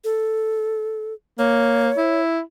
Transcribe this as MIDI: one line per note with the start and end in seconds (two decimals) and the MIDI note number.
0.04 1.14 69
1.39 1.90 58
1.39 2.21 73
1.97 2.41 64